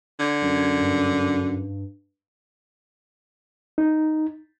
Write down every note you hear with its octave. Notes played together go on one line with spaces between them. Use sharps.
D3 G#6
F#2
G2
D#4